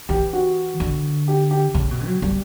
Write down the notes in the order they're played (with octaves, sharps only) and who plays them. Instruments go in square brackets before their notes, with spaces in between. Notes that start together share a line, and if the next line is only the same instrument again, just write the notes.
[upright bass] E3 [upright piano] G4
[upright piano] F#4
[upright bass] D3
[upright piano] G4
G4
[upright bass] C#3
B2
F#3
G3